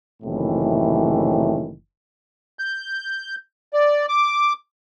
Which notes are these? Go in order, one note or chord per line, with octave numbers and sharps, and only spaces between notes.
F#1 A2 C3 D#3 E3
G6
D5
D6